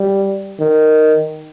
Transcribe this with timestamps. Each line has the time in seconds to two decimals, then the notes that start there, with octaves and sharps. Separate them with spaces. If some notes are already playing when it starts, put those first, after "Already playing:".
Already playing: G3
0.60 D#3